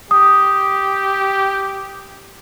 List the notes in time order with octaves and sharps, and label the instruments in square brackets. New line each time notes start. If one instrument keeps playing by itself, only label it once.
[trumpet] G4 [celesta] D#6